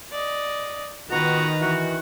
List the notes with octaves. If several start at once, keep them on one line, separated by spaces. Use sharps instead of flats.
D5 D#5
D#3 B3 F4 F#4 B4 A#5
E3 F#4